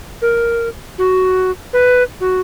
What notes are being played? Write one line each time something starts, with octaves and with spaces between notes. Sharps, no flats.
A#4
F#4
B4
F#4